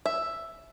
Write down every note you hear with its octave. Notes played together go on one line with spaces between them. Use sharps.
E5